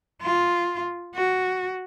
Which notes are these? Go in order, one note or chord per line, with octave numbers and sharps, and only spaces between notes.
F4
F#4